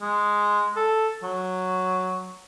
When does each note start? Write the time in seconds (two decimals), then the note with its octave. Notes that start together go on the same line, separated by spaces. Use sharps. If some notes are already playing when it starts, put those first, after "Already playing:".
0.01 G#3
0.76 A4
1.23 F#3